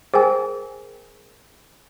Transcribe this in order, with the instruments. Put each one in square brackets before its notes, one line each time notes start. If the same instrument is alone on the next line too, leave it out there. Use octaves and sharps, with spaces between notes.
[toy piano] G#4 A#4 G#5 [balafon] C5 G5